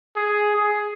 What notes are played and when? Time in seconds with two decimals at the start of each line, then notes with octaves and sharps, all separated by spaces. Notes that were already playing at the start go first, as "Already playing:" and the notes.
0.16 G#4
0.56 G#4